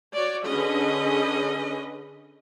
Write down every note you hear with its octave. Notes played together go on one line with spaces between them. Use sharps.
F#4 C#5 D5
D3 C#4 G#4 B4 D#5